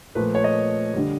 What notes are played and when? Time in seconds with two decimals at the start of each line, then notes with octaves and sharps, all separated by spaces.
0.15 A#2 F3 A3 B4
0.35 C#5
0.44 D#5
0.94 D3 G3